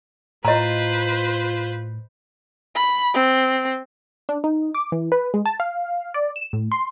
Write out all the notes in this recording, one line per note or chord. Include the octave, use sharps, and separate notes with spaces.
A2 F4 B4 C5 D#5 A#5
B5
C4
D4
D#4
D6
E3
B4
G#3
A5
F5
D5
E7
A2
C6